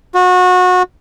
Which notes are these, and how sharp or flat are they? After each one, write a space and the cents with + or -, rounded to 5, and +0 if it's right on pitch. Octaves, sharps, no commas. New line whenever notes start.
F#4 -25